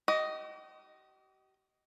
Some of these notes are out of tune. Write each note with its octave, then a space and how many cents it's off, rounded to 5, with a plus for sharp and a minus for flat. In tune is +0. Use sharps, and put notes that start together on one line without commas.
G4 -40 D#5 +0